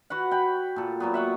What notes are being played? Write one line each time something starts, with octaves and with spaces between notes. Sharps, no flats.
F#4 B4 F#5
G5 B5
A#2 A4
A#2 F#3 B3
E5 F#5 C#6